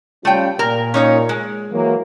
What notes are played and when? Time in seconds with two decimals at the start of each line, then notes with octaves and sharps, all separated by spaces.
0.25 G3 A3 C#4 F4 G5
0.59 A#2 A#4
0.94 C#4 D#4 C#5
1.29 G#3
1.72 E3 F#3 A#3